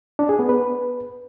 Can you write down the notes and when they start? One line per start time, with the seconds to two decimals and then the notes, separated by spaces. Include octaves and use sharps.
0.19 D4
0.29 G#4
0.39 B3
0.49 B4